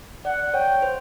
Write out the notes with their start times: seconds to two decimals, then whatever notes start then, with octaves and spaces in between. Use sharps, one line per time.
0.25 D5 F#5
0.54 C#5 G5
0.82 C5